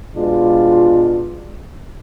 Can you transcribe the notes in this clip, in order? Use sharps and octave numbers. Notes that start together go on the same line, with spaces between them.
B2 G#3 D4 F4